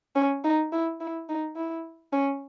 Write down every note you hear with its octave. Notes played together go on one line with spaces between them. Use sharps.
C#4
D#4
E4
E4
D#4
E4
C#4